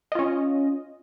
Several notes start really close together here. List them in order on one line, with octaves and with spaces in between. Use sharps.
D#5 F4 C#4